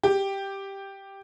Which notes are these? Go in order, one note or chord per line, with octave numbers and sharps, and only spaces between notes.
G4